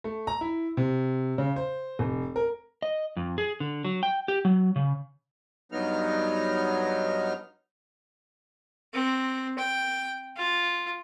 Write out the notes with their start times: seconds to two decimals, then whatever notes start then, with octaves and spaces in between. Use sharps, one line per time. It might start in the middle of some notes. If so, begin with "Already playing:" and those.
0.04 A3
0.27 A#5
0.41 E4
0.77 C3
1.38 C#3
1.56 C5
1.99 F1
2.36 A#4
2.82 D#5
3.16 F2
3.38 G#4
3.60 D3
3.85 F#3
4.03 G5
4.28 G4
4.45 F#3
4.76 C#3
5.72 G2 F#3 B3 D#4 F6
8.94 C4
9.59 G5
10.36 F4